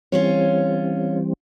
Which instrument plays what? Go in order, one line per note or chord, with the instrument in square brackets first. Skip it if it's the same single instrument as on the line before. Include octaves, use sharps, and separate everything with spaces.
[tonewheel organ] E3 G3 C4 [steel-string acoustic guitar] C#4 F4 C#5